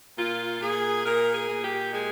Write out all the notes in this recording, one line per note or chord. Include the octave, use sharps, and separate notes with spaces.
A#2 F4
A#2 G#4
A#2 A#4
G#4
A#2
G4
G#3 G#4